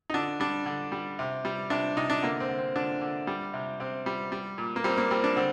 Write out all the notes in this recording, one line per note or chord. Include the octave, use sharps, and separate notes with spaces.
D#4
D3 D4
G3 D4
D3
G3
C3
G3
C3 D4
C3 D#4
D4
D3 A#3
C4
D3
C4
D3 D4
D3
G3
C3
C3 C4
G3
G3
A#2
A#3
G3 C4
A#3
G3 C4
D4
D3 C4